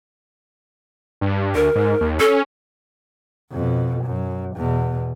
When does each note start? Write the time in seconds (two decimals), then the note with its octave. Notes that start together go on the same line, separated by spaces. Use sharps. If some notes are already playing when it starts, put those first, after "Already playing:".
1.21 G2
1.55 D2 A#4
1.75 G#2
2.01 D#2
2.20 C#4 A4
3.52 F2 B2
4.05 F#2
4.56 E2 B2